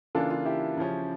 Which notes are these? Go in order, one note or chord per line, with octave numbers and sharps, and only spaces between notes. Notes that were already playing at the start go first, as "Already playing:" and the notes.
C#3 E3 A#3 D4 F4 A4
F4
E4 G4
C#3 F3 C#4